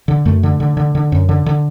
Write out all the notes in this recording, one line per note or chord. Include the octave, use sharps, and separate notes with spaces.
D3
F#2 A3
D3
D3
D3
D3
F#2
D3
D3